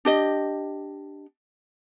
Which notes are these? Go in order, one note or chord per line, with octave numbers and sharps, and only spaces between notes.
D4 G4 D#5